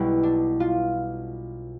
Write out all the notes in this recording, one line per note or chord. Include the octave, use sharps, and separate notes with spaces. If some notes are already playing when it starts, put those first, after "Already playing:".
Already playing: B1 B2 G3 E4
D4
F4